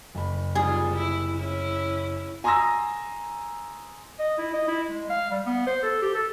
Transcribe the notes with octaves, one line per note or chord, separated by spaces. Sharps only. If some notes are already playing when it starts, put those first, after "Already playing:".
F#1 B5
C3 G3 F4 G#4
E4
C#4 E4
G#5 A#5 C6 D#6 E6 A#6
D#5
E4
D#5
E4
G#3
F5
G3
B3
C5
A4
G4
A4